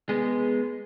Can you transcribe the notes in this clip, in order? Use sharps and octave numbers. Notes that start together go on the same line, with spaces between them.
G#3 B3